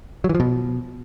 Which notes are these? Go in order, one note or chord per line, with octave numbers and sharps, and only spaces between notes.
F#3
E3
F3
B2